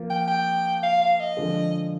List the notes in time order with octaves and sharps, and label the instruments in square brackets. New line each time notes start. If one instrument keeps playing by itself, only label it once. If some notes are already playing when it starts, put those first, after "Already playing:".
Already playing: [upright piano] F3 A#3
[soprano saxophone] G5
G5
F5
F5
D#5
[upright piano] D3 F3 G#3